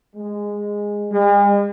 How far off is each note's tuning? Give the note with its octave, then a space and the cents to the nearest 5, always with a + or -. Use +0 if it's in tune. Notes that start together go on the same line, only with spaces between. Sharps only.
G#3 -10
G#3 -45